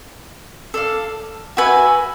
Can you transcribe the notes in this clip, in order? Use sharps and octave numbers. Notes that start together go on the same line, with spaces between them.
A4 D5 F5
F#4 B4 E5 G#5